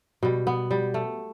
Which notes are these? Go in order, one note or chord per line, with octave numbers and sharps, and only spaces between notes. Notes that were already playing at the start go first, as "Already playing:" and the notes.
B2 G3
B3
G3
A3